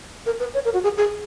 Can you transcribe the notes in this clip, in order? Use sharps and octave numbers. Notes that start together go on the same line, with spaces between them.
A#4
B4
C#5
A#4
F#4
G#4
G#4